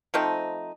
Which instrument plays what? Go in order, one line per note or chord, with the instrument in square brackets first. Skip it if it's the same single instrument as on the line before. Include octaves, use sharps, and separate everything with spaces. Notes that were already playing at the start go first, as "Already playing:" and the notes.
[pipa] F3 A3 C4 D#4